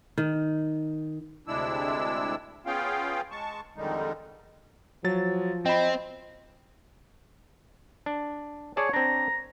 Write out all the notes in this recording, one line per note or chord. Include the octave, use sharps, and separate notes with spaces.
D#3
D2 C3 G#3 D4 E4 E6
B3 C#4 F4 G#4 F5 G5
G#3 A5 C#6
F2 D3 D#3 G3 G#3 D#4
F3 F#3 A6
C4 D#5 G5 B5
D4
G#4 C#5 D5 A5
C4 D4 A#5